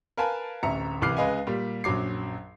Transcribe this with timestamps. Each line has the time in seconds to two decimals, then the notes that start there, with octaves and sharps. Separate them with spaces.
0.17 A#4 B4 F5 G#5 A5 B5
0.63 D1 A1 E5 A#5 C#7
1.02 C2 E3 D6 F6 C7
1.17 C#2 G#3 B4 D#5 F5 G#5
1.47 A#2 G3
1.84 A#1 F#2 F#3 D6 C7